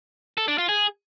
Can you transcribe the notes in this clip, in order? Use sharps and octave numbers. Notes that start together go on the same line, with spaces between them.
A4
D4
F4
G#4